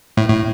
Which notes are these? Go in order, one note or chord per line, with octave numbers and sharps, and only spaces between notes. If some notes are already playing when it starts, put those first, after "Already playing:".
A2
A2